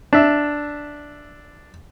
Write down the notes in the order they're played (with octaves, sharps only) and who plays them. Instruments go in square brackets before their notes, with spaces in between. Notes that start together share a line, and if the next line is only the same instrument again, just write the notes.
[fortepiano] D4 E5